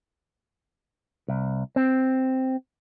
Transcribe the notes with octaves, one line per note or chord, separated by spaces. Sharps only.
C2
C4